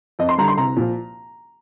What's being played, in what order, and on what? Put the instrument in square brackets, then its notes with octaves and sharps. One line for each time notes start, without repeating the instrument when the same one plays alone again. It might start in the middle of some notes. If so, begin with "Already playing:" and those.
[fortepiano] F2 D#5
C6
D3 G3 A#5
C6
C2 A#5
A#2 F3